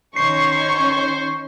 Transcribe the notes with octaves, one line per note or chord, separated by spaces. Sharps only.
D#3 C#4 C5 C#5 C#6 C7